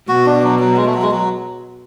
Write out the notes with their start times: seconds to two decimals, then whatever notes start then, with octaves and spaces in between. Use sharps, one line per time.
0.08 B2 F#4
0.26 D4
0.43 F#3
0.59 F#3
0.76 G#3
0.85 A3
0.94 F#3
1.02 G#3
1.11 F#3